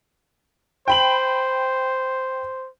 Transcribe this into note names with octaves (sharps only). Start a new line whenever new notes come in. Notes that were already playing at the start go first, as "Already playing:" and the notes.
C5 G5 B5 F#7